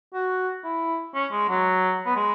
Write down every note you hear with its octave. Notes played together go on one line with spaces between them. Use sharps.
F#4
E4
C#4
G#3
F#3
B3
G#3